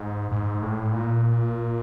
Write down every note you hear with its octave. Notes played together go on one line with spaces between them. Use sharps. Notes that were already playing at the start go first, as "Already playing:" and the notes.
Already playing: G#2
G#2
A2
A#2